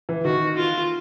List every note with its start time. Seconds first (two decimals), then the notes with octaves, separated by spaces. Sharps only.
0.09 E3
0.25 D#3 F#4
0.57 F4